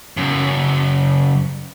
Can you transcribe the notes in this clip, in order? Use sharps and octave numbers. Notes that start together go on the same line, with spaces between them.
F#2 C#3